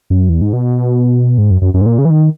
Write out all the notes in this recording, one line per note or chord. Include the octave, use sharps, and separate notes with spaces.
F#2
E2
G#2
B2
G#2
F#2
F#2
F#2
G#2
A#2
C#3
E3
D#3